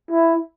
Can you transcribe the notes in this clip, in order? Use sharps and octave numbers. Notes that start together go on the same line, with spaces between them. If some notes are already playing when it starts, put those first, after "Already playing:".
E4